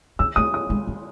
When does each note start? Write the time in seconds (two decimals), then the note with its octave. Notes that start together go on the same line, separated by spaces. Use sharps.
0.19 C4 E6
0.36 A3 D#6
0.54 D#6
0.70 G#3
0.87 F#3